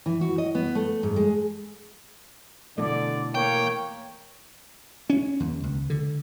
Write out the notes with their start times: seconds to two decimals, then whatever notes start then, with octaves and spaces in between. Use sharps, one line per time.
0.06 E3
0.21 F#4
0.38 D#5
0.55 B3
0.75 A3
1.03 G#2
1.16 G#3
2.78 B2 D3 E3 A3 D5
3.35 A#3 C#5 G5
5.10 C#4
5.40 D#2
5.63 C#2
5.90 D3